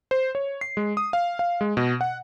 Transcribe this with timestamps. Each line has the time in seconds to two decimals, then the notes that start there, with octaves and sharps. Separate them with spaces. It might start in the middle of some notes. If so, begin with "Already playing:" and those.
0.11 C5
0.35 C#5
0.61 C7
0.77 G#3
0.97 D#6
1.13 F5
1.39 F5
1.61 G#3
1.77 B2
2.01 F#5